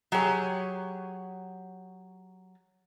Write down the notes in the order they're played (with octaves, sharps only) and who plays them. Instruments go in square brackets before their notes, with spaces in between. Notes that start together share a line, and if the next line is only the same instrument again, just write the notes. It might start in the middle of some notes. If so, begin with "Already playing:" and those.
[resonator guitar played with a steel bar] F#3 G4 G#4 C#5